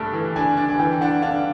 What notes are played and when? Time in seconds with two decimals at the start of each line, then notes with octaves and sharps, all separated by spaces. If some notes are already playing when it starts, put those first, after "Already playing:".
Already playing: G2 A3 D4 A5
0.13 E3
0.36 D4 G#5
0.57 D4
0.70 G#5
0.79 E3 G5
1.01 D4 F#5
1.22 D4 F5